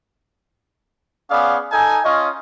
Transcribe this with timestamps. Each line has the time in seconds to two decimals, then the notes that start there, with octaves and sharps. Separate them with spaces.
1.30 B3 C#4 G#4 D5 F5
1.72 D#4 A4 G#5
2.05 C#4 F4 C#5 D#5